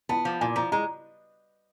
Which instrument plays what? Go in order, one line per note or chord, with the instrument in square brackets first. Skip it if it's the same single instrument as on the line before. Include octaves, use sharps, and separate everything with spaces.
[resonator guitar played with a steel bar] B3 [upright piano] A5
[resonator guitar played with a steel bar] F3
[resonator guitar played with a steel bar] A#2 [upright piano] G#5
[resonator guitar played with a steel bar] F3 [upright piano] A#5
[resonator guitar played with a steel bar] G#3 [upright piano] A#5